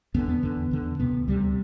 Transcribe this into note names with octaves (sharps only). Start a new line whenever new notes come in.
E2 D3 B3
B3
E2 D3
E2 D3
D2 C3 B3
D2 C3 G3